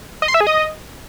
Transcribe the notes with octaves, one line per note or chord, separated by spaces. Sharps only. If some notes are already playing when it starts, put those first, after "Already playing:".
D#5
C6
E5
G#4
D#5